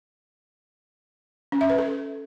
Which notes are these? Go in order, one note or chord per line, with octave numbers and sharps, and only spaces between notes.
C#4
E5
B4
A4